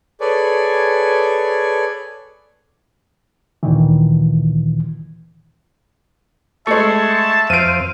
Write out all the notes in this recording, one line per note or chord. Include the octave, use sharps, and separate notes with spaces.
G#4 A4 B4 C#5 D5 G#5
D2 A#2 D#3 E3
G#3 A3 E5 A5 C#6
F2 C5 F5 D7 D#7